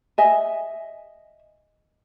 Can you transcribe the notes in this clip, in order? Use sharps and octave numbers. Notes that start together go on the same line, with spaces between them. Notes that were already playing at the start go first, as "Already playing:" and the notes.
D#5 E5 G#5